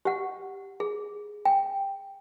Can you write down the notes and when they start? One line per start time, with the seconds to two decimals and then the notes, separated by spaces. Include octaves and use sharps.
0.05 G4 F#5
0.80 G#4
1.45 G5